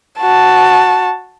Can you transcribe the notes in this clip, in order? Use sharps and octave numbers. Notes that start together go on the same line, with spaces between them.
F#4 A5